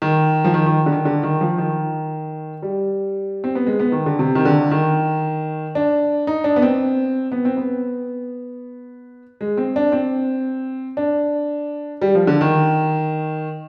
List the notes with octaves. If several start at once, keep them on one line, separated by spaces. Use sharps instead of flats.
D#3
F3
D#3
D#3
D3
D#3
D3
D#3
F3
D#3
G3
C4
B3
G#3
B3
D#3
D3
C3
D#3
D3
D#3
D4
D#4
D4
B3
C4
B3
C4
B3
G#3
C4
D4
C4
D4
G3
F3
D3
D#3